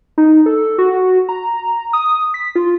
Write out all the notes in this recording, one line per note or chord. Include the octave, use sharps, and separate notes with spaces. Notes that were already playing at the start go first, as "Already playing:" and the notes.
D#4
A4
F#4
A#5
D#6
B6
F4